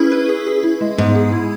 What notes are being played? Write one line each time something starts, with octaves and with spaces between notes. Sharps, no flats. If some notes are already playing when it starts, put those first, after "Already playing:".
Already playing: C#4 E4 G#4 B4
B4
G#4
G#4
E4
G#3
G#2 B3
G#4
E4